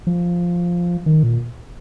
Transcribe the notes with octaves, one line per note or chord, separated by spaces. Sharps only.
F3
D#3
A#2